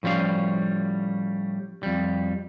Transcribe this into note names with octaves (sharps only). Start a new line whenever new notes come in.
A2 F3 G3 C#4 F5
F2 G3